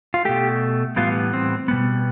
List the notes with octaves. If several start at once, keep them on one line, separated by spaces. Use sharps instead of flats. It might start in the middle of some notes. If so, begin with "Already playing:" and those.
F4
B2 A3 G4
A2 E3 G3 B3 F4
C4
B2 G3 B3